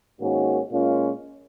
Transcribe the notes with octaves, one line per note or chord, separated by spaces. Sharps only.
G#2 D#3 A#3 C#4 F#4
A#2 G#3 C#4 F4